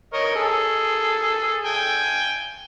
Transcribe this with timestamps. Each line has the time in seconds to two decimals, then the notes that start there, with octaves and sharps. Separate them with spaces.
0.14 A#4 C#5 D#5
0.36 G#4 A4
1.65 G5 G#5